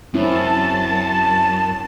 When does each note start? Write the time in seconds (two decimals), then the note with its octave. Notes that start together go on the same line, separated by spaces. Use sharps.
0.14 F#2 C4 C#4 E4 A5